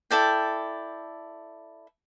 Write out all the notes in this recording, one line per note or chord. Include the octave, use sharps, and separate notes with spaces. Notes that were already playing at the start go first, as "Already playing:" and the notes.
E4 A4 D5 G5